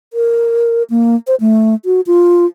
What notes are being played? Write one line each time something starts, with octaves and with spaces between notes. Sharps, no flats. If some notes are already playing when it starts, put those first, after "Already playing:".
A#4
A#3
C5
A3
F#4
F4